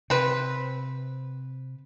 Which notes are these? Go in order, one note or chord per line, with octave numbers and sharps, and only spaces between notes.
C3 C4 B4